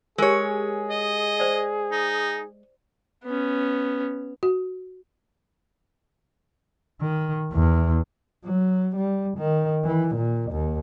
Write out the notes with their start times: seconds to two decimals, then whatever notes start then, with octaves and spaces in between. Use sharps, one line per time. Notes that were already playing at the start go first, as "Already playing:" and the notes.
0.18 G#3 G4 G#4 A#4 C#5
0.90 D#5
1.40 C5 D5
1.92 D#4
3.24 B3 C#4
4.43 F#4
7.01 D#3
7.53 E2
8.45 F#3
8.96 G3
9.38 D#3
9.85 E3
10.15 A#2
10.51 D#2